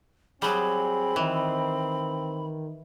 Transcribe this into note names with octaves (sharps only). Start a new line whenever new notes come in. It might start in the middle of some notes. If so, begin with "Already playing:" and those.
F#3 G3 C4 G#4 B5
D#3 E3